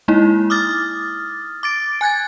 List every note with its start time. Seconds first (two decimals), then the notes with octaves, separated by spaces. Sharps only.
0.08 G#3 A#3 D#4 E4
0.50 D6 D#6 F6 A6
1.63 D6 A6 D7
2.01 G#5 F#6 G#6 A6